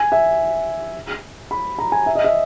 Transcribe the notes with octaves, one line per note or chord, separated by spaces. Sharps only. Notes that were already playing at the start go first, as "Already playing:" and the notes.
Already playing: G#5
E5
B5
A#5
G#5
E5
D#5
E5